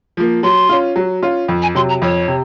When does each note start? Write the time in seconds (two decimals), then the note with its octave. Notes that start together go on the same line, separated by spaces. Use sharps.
0.17 F3 A#3
0.43 F#3 C6
0.69 C#4 F4
0.96 F#3
1.23 C#4 F4
1.48 F2
1.62 G#5
1.75 C3 F#3 C6
1.89 A#5
2.02 F2 C#5
2.28 C3